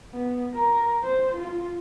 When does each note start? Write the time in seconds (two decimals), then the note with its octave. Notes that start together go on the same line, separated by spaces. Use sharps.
0.13 B3
0.54 A#4
1.03 C5
1.37 F4